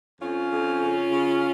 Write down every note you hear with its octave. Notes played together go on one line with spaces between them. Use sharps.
F2 C#4 F4
F2
C#3
C#3